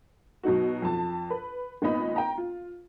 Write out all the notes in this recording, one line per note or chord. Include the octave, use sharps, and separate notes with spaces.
B2 F#3 D#4 F#4
F2 A5
B4
G#1 A#2 B3 D#4 D#5 B5
G5 A#5
F4